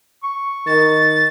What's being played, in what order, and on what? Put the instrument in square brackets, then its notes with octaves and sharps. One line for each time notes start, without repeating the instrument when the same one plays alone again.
[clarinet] C#6
[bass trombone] D#3 [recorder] A6